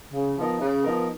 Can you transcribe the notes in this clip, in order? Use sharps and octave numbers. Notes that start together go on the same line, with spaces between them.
C#3
F3 B3 D#4 A#4
C#3
F3 B3 D#4 A#4